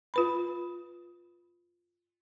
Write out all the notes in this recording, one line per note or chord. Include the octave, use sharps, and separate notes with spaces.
F4 B4 B5